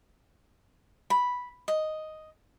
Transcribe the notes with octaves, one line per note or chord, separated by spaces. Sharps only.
B5
D#5